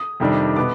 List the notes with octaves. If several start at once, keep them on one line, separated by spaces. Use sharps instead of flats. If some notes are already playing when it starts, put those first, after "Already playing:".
Already playing: D#6
F2 C3 D#3 G3 D4
B2 B3 D6